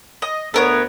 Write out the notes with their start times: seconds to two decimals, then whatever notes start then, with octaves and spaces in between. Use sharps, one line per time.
0.22 D#5
0.54 D2 B3 A4 A#4 C#5